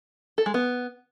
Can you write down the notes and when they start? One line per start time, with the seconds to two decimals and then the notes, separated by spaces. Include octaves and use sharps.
0.38 A4
0.46 G#3
0.54 B3